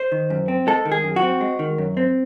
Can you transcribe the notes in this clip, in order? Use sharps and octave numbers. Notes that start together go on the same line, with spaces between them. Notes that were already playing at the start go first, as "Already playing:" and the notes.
Already playing: C5
D#3
F#2
C4
G#3 A4
D#3
G#4
F#2
F#4
C4
G#3
D#3
F#2
C4